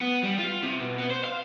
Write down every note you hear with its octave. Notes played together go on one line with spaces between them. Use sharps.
B3
G3
F4
C3
B2
B3
C5
F5